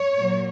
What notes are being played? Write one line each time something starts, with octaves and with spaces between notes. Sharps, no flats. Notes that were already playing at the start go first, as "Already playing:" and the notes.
Already playing: C#5
A#2 F#3